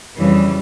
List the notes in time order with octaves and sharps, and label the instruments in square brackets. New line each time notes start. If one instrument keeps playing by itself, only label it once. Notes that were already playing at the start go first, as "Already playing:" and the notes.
[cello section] F2 C#3 E3 G3